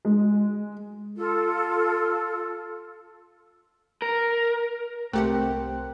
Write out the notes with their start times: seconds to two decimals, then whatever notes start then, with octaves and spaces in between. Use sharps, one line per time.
0.05 G#3
1.16 F4 A4
4.02 A#4
5.13 C2 A3 C4 G4 A#4 F#5 G5 F#6